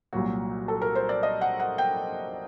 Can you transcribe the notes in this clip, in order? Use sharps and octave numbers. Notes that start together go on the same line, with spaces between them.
C2 A#2 F#3 F#4
A4
A#4
C5
D5
D#5
F#5
F#5
G5